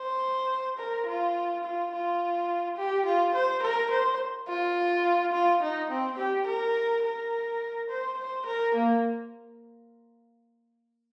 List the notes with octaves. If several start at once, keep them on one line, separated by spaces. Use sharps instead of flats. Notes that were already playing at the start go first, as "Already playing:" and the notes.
Already playing: C5
A#4
F4
F4
F4
G4
F4
C5
A#4
C5
F4
F4
D#4
C4
G4
A#4
A#4
C5
C5
A#4
A#3